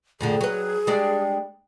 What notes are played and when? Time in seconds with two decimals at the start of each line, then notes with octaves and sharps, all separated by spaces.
0.21 F2 A2 D3 G#4
0.41 F#3 B4
0.87 G3 G#3 D4